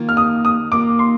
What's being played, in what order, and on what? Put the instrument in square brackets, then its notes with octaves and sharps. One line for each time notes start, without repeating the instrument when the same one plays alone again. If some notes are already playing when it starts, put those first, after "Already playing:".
Already playing: [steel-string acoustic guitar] D#3 A#3 F4
[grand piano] F6
D#6
D#6
[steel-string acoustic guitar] D#3 A#3 F4 [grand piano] D6
[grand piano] C6